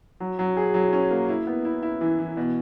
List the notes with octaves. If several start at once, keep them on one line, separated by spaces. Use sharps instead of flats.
F#3
F#3
G#4
F#3
C#4
A#3
E4
B3
E4
E4
E3
E3
B2